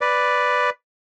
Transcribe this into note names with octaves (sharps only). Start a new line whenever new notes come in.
B4 D5